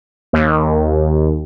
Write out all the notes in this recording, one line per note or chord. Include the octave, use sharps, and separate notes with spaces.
D#2